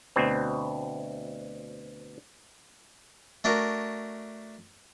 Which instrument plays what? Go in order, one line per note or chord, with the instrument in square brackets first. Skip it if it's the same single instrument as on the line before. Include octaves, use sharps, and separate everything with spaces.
[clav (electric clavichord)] D2 B2 C4
[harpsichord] A3 D4 F#4 A#4